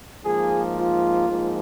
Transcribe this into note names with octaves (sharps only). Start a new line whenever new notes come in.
G#2 F3 A#3 G#4
F4
G#2 F3 A#3